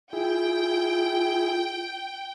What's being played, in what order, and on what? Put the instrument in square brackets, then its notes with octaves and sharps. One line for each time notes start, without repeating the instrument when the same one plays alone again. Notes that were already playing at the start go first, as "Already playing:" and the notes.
[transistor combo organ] E4 G#4 [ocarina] F4 [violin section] G5